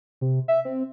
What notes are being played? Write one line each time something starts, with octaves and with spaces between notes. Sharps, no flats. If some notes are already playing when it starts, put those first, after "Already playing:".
C3
E5
C4